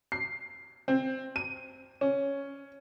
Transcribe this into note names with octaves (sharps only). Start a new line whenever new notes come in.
C7
C4
D#7
C#4